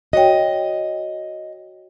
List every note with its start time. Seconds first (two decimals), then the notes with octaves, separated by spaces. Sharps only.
0.13 F#4 C#5 D#5 G5